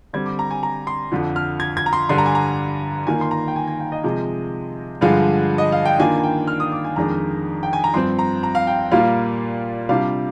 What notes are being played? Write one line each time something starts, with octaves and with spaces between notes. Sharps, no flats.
D3 G3 C4 G#6
D6
A#5
G#5
A#5
C6
F2 D3 F3
F6
G#6
G#6
A#5
C6
G2 D3 G3 C6
A#5
G#5
A#5
D#3 A#3 F4 G#5
C6
A#5
G5
G#5
G#5
G5
D#5
C3 F3 G#3
G2 D3 F3 G#3 F5
D#5
F5
G5
D#3 A#3 D4 F4 G#5
G#5
G5
F6
D#6
D6
G#5
F2 D#3 G#3 D4 A#5
G5
G#5
A#5
G2 F3 C4 C6
A#5
A#5
F5
G5
A#2 G3 A#3 F4 F5
C3 G3 D4 F4 F5